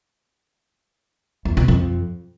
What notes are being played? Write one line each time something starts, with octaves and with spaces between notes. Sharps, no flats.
E2
B2
F2